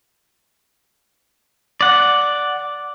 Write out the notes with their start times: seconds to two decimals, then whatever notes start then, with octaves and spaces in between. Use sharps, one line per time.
1.81 D5 F#5